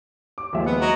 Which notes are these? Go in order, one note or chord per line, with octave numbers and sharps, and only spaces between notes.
D6
D#2 F3 G#3 E5
B3 F#5
F#3 D#5